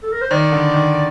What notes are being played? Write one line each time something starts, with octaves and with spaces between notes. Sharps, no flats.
A4
A#4
C5
D#3 D5
D3
D#3